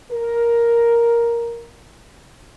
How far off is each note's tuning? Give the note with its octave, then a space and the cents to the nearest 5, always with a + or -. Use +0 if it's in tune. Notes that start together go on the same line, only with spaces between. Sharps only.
A#4 +5